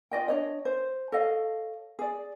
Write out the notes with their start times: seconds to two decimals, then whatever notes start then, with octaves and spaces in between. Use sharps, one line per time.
0.11 F4 D5 D#5 G5
0.28 D4 C#5 D#5
0.65 C5
1.12 A4 C#5 D#5 F5
1.99 G#4 D5